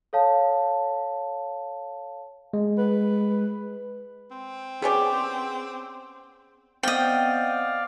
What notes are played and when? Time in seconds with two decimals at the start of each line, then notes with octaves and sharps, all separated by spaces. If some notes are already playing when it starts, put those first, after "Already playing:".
0.13 A4 C#5 F5 A5
2.53 G#3
2.78 B4
4.31 C4
4.82 B3 C#4 G4 G#4 C5 D5
6.83 B3 C4 C5 D5 D#5 F5 G5